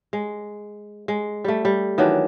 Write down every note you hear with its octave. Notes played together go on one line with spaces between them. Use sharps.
G#3
G#3
G3 A3
G3
D#3 E3 F#3 D4